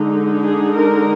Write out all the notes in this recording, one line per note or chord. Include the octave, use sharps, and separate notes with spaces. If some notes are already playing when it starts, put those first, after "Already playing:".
Already playing: D3 G#3 D#4
G#4
A#4